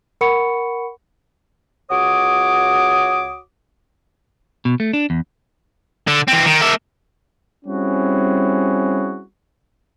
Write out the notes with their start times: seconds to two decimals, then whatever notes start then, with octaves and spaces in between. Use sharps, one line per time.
0.21 A#4 F#5 B5 C#6 C#7
1.90 C#2 F#4 C#5 D6 D#6
4.65 B2
4.80 A3
4.93 D4
5.10 E2
6.08 D3
6.28 E3 C4
6.46 D#3
6.61 A#3 E5
7.65 G3 C4 C#4 E4 F#4 G#4